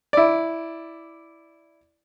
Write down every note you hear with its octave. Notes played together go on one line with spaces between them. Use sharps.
E4 D5